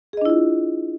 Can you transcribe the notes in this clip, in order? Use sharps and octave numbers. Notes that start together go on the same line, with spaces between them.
D4 E4 F4 G#4 D#5